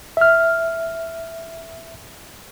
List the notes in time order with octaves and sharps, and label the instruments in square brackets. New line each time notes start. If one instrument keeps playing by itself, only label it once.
[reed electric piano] E5 F6